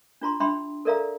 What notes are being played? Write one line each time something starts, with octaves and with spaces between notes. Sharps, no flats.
D4 F4 A#5 C6
D4 E5 G5 B5 C6
A4 A#4 D5 E5 F5 A#5